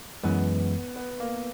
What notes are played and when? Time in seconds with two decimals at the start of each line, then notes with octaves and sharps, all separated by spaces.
0.23 F#2 E3 G#3 B3
0.96 B3
1.20 A#3